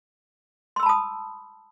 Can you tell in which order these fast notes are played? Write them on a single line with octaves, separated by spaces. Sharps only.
C6 E6 B5 A5 D#6